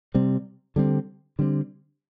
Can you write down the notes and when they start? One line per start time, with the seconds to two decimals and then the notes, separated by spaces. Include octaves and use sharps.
0.14 C3 G3 C4
0.76 D3 G3 C4
1.39 D3 G3 C4